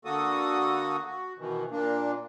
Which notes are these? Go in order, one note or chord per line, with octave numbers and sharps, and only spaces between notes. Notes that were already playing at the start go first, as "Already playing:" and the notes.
D3 A#3 F#4 A4 D#6
F#4
B2 D#3 E3
A#2 A#3 D4